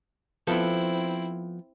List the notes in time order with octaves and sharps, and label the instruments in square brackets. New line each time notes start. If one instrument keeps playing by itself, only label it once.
[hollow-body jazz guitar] F3 B3 A4 [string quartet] C4 E4